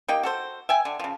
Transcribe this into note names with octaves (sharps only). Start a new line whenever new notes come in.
A#3 D#4 G4 G5
F#4 A4 C5
E5 G5 G#5
D3
C#3 F3